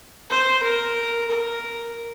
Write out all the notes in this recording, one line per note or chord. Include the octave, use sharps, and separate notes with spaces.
C5
A#4
A#4